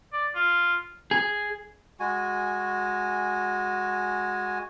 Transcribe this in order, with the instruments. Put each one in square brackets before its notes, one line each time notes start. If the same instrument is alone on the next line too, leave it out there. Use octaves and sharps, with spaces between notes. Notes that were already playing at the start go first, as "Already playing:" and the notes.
[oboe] D5
F4
[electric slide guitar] G#4
[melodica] G#3 F#4 G#5